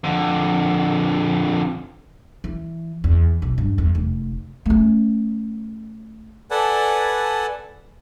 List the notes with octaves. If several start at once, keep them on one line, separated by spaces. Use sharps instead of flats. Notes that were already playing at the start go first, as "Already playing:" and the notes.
F2 D3
E3
E2
B1
G2
E2
F1
A3 C#4
A4 B4 D5 F#5 G#5 A5